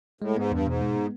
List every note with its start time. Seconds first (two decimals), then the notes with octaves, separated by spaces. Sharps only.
0.21 A2 G#3
0.36 G#2 B3
0.51 E2 G2
0.66 G#2 B2
0.82 G#3
0.96 B3